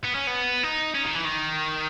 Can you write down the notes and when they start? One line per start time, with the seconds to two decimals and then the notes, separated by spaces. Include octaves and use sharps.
0.04 B3
0.15 C#4
0.27 B3
0.63 D#4
0.94 C#4
1.03 D#3
1.15 E3
1.25 D#3